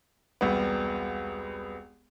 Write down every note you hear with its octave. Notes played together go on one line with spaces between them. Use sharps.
E1 C2 B3